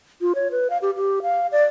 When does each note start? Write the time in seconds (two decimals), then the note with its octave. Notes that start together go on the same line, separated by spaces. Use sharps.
0.21 F4
0.35 C#5
0.51 B4
0.70 F5
0.82 G4
0.96 G4
1.22 F5
1.52 D5